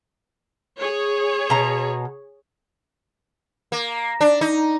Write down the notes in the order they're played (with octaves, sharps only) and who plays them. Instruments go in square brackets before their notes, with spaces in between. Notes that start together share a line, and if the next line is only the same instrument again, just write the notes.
[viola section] G#4 C#5
[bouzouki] B2 A#5
[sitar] A#3
D4
D#4